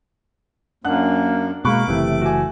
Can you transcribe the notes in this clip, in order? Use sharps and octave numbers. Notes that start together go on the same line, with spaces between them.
F#2 A#3 D4 F#5 F#6
B2 G#3 A#3 B5 C#6 D6 F#6
F#1 C3 E3 A3
F#4 G#5